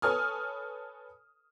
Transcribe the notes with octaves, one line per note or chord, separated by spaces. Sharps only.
A4 B4 C#5 G#5 D#6 F6